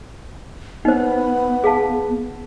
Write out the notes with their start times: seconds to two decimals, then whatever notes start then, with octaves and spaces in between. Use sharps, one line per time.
0.85 B3 D#4 C5
1.64 G#4 F5 A5